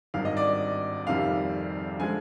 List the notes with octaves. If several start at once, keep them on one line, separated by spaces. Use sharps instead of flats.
G#1 G2 D#3 F5
D#5
D5
F1 F2 C3 D#3 G3 F5
D3 F3 G#3 G#5